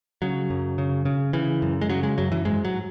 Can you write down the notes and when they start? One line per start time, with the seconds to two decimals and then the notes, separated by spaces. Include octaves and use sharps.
0.22 C#3 F#3
0.50 F#2
0.78 C#3
1.05 C#3
1.33 C#3 E3
1.62 F#2
1.81 G#3
1.89 C#3 F#3
2.03 G#3
2.18 F#2 F#3
2.32 E3
2.45 G#2 G#3
2.65 F#3